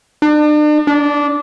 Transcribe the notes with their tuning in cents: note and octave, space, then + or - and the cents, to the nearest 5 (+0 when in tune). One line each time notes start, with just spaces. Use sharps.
D4 +40
D4 -15